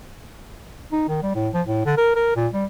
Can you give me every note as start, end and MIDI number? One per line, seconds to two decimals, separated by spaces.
0.92 1.04 63
1.08 1.18 51
1.22 1.30 55
1.35 1.49 45
1.54 1.61 53
1.67 1.81 45
1.86 1.95 50
1.97 2.13 70
2.15 2.33 70
2.36 2.48 46
2.53 2.65 55